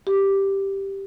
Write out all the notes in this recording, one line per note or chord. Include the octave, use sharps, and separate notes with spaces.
G4